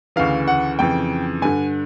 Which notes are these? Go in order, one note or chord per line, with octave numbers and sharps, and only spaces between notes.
D2 C#3 E3 F5
F#5
F2 C#3 E3 G5
G2 D3 G#5